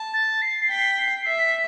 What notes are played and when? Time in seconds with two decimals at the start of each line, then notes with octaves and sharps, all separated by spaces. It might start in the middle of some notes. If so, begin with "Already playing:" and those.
Already playing: A5
0.14 A6
0.42 C7
0.70 G5 B6
0.98 C7
1.26 E5 B6